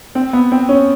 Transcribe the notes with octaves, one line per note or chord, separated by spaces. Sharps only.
C4
B3
C4
C#4